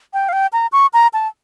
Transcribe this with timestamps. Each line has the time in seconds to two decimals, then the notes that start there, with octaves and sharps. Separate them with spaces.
0.13 G5
0.29 F5
0.33 G5
0.53 A#5
0.72 C#6
0.93 A#5
1.13 A5